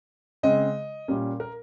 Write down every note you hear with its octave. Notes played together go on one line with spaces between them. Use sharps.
C#3 G#3 C4 D#5
A#2 G3 A#3 C#4
A#4